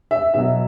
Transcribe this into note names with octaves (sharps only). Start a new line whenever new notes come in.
E5
B2 F#3 E5